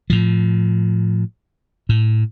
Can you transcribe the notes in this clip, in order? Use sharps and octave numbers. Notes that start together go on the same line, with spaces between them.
A2 F3
A2